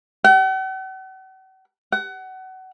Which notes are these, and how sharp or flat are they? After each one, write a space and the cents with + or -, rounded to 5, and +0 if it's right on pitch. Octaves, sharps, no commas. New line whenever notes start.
F#5 +45
F#5 +25